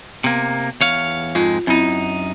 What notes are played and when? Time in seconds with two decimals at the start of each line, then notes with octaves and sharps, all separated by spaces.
0.24 C3 A#3 B3
0.81 E2 C#5 F5
1.35 F2 G#2 G#3 F4
1.67 F#2 C4 D#4 E4